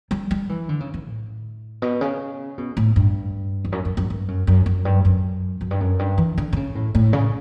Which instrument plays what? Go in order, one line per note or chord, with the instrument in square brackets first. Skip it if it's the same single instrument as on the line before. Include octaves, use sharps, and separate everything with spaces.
[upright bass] G3
G3
E3
D3
C#3
E3
A2
B2
C#3
B2
A2
G2
E2
F#2
F#2
F#2
G2
F#2
F#2
F#2
G2
F#2
F#2
G2
F#2
G2
E3
D3
D3
C#3
A2
A2
C#3